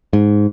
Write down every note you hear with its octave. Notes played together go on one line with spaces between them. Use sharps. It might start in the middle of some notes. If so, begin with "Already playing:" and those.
G#2